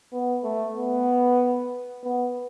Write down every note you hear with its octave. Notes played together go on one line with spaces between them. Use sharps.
B3
A3
B3
B3